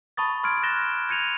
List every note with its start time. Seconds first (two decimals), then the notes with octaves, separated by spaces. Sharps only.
0.17 A5 B5 C#6 D#6 A6
0.44 C6 F6 G#6 D7
0.63 F6 F#6 A6 A#6 E7 G7
1.09 G6 G#6 C#7 D#7 F7